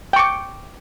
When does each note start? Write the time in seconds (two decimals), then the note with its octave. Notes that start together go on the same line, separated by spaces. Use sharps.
0.13 G5
0.16 C#6
0.19 D6